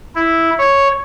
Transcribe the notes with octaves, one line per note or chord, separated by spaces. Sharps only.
E4
C#5